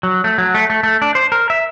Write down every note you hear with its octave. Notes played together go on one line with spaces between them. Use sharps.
F#3
A3
F#3
A3
A3
A3
D4
C5
A#4
E5